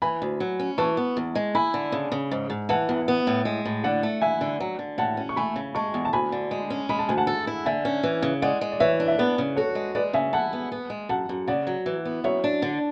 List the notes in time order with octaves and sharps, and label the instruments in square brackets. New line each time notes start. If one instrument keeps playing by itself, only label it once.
[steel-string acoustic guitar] E3 [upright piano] G#5 B5
[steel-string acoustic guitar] D2
F#3
C#4
[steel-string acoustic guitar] E3 [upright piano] A5 C#6
[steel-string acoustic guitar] B3
E2
G#3
[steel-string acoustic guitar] E4 [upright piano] G#5 B5
[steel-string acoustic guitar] D3
C#3
C#3
G#2
G#2
[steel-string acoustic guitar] E3 [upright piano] F#5 A5
[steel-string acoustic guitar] E2
B3
A2
G#3
A2
[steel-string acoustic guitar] D3 [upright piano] D5 F#5
[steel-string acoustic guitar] A3
[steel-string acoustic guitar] E4 [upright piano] E5 G#5
[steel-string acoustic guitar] D3
F#3
D3
[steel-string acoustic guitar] A2 [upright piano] F#5 A5
[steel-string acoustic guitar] C#4
[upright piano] C#6
[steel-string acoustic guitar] A3 [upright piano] G#5 B5
[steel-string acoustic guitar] C#3
[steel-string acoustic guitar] G#3 [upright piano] A5 C#6
[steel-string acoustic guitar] E2
[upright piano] A5
[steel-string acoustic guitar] D2 [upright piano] G#5 B5
[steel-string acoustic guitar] D3
G#3
C#4
[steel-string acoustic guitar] G#3 [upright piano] B5
[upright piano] A5
[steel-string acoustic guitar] D2 [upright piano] G#5
[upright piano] F#5 A5
[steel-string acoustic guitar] A4
E4
[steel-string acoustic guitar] D3 [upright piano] E5 G#5
[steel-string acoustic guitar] C#4
E3
C#3
[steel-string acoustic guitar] G#3 [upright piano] D5 F#5
[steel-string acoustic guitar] G#3
[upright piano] D5
[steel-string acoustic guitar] E3 [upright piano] C#5 E5
[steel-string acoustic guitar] D4
[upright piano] E5
[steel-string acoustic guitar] B3 [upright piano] B4 D5
[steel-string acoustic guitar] C#3
[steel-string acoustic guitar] F#4 [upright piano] A4 C#5
[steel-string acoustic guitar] G#3
[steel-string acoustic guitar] G#3 [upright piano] B4 D5
[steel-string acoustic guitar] C#3 [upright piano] E5 G#5
[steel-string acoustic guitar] E4 [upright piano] F#5 A5
[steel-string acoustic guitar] B3
B3
G#3
[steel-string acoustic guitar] F#2 [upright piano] F#5 A5
[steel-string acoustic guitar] F#2
[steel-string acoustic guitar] C#3 [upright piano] D5 F#5
[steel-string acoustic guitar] F#3
E3
B3
[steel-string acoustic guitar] F#2 [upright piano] C#5 E5
[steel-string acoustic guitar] D4
D3